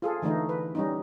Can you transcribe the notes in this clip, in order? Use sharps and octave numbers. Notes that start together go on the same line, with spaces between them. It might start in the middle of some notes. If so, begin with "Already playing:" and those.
F4 G#4 A4
D3 E3 A3 D#4
B4
G3 C#4 D#4